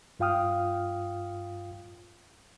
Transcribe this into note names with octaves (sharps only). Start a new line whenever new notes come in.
G2 F4 F5 G5 D#6 F6